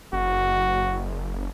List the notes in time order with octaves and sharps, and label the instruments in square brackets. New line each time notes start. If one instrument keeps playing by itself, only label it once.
[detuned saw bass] F#1 [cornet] F#4